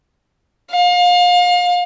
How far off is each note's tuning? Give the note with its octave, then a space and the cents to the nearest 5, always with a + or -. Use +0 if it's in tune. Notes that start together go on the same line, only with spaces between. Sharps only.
F5 +30